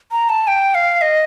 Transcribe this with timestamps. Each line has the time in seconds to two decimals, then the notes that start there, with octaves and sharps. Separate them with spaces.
0.11 A#5
0.29 A5
0.47 G5
0.75 F5
1.01 D#5